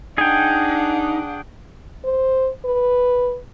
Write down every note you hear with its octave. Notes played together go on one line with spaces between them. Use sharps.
D4 D#4 G#4 F#5 G5
C5
B4